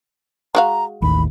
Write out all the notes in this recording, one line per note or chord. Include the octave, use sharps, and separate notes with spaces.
G#3 F#4 F5 A#5
A1 D#2 B5